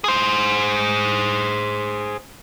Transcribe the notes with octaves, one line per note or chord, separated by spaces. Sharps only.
G#4 C5